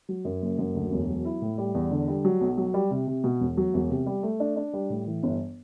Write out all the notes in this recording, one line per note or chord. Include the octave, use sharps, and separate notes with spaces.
F#3
F#2
F#1
F#2
D2
E1
F#3
E4
A2
G3
E2
D3
G3
F#3
B1
F#3
G3
C3
C3
B2
E1
F#3
E1
C3
G3
A3
D4
D4
G3
A2
E3
G1